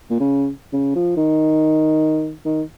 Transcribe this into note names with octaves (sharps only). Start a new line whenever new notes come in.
A#2
C#3
C#3
F3
D#3
D#3